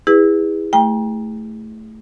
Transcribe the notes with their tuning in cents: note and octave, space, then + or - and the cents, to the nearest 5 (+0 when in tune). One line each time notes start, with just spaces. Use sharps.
E4 -15 G#4 -30 B4 +0
A3 +0 G5 +30 A#5 +35